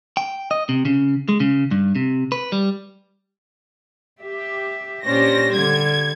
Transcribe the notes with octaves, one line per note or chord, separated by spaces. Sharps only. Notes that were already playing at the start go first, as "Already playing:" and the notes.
G5
D#5
C3
C#3
G#3
C#3
G2
C3
B4
G3
G4 E5
A#2 C#4 D4 G4 C5 A#6
D3 G3 G#6